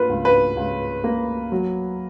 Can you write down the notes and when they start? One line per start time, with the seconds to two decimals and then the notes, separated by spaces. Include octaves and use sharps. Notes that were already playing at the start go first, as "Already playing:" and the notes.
Already playing: A#3 F4 B4
0.09 C#2
0.25 B4
0.57 C#2
1.04 A#3
1.52 F#3